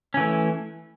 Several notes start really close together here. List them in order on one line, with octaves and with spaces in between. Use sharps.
C#4 E3 A3